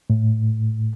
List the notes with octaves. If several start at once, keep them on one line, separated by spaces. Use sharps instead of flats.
A2